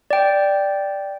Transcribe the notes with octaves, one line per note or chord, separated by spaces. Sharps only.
D5 G5